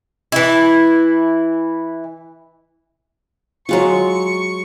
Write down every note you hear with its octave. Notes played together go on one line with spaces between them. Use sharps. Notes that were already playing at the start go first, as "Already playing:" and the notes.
E3 E4
F#3 G#3 F4 C#6